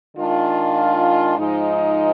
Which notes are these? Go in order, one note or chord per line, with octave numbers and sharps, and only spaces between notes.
D#3 G#3 D4 F4
G#2 F3 G#3 D#4